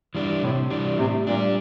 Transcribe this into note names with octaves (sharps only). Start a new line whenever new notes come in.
E3 G3 D4
A2 C3
E3 G3 D4
A2 C3
A#2 G3 D4